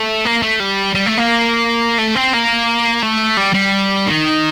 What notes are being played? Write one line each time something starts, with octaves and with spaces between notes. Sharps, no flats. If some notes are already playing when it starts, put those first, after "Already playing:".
Already playing: A3
A#3
A3
G3
G3
A3
A#3
A3
C4
A#3
A3
G3
G3
D#3